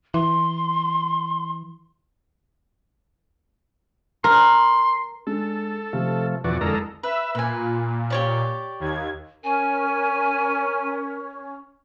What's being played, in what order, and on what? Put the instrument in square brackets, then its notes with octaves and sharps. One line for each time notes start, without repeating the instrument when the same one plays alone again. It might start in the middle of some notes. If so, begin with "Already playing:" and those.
[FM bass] E3 [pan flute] C6
[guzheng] A#4 [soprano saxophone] C6
[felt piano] G#3 D4 [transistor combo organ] A4
[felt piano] C3 [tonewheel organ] F3 A3
[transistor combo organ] E2 F#4 D5 [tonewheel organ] B2 E3 [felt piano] F3
[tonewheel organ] F2 D3 A#4 [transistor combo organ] G#3 A4 A#5 [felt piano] E4
[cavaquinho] B4 [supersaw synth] E5 E6
[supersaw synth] A#2 [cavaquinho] B4 G#5
[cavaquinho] G4 C#5 D5
[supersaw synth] D#2 G#6
[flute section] C#4 [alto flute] A#4 [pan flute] G#5